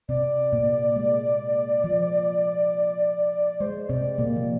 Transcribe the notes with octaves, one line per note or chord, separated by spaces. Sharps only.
C3 C4 D5
A#2 A#3
G#3
F3
G#3 C5
C3 C4 D5
A#2 A#3 D5
F3